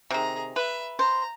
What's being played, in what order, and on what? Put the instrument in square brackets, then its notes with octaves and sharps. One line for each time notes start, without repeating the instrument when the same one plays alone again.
[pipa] C3 D#3 [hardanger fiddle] G#4 A#5
[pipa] B4 [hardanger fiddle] E5
[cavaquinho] C5 [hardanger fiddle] A#5